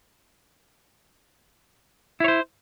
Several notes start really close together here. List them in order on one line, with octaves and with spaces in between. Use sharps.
E4 C#5 C5